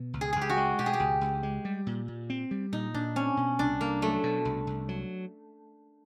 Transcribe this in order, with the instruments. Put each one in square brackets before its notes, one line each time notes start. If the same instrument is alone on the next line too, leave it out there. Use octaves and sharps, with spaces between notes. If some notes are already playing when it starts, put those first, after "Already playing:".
Already playing: [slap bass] B2
C#2
[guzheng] G#4
[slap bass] C#2 [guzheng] G#4
[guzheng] G4
F#4
[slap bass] G#3
[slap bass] B2 [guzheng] G4
[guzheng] G#4
G4
[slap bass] C#2
C#2
G#3
G3
A#2
A#2
C4
G3
[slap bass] A#2 [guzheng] D#4
[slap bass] A#2 [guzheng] D4
[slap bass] C4 [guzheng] C#4
[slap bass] B2
[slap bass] C2 [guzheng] D4
[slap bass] C2 [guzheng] A#3
[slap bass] F#3 [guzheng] A3
[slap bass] B2
C2
C2
F#3